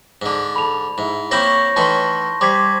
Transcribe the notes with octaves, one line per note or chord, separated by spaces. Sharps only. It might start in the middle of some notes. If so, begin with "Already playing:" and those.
G#2 D3
A4 B5 F7
G#2 E4
A#3 C4 E4 C#5 C#6 G6 A#6
D#3 E3 A3 A5 C6
G3 C5 D6 G#6 B6